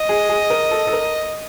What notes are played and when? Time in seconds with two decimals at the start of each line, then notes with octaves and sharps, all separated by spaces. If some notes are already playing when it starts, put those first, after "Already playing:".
Already playing: D#5
0.09 G#4
0.29 G#4
0.50 A#4
0.71 A4
0.87 A4
0.93 A#4